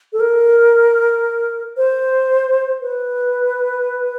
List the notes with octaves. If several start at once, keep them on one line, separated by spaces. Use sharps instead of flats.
A4
A#4
C5
B4